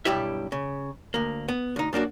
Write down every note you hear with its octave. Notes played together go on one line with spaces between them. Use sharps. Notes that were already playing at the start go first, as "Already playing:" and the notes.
B1 G2 G3 E4 G4 E5
C#3
D2 A#3
B3
D2 D#4
F#2 A#3 D4 F#4